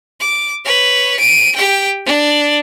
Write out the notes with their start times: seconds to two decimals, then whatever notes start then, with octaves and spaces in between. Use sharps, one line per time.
0.20 D6
0.65 B4 C#5
1.19 D7 D#7
1.55 G4 G5
2.06 D4 D5